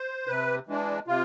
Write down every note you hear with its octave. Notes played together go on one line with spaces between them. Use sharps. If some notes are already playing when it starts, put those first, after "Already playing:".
Already playing: C5
C3 B4
E3 G#3 D4
C3 F4